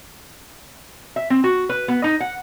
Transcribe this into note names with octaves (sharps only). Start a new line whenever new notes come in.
E5
C4
F#4
B4
B3
D#4
F#5